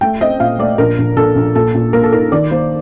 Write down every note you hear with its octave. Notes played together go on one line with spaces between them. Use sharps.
A3 G5
C4 D#5
A#2 F5
A3 D5
A#1 A#4
A#1
A#1 A4
A#1
A#2 A4
A#2
A#3 A#4
A4
D#4 A#4
D#3 D5
A#3 C5